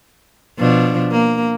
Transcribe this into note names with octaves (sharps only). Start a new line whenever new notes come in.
B2 F3 D4
A#3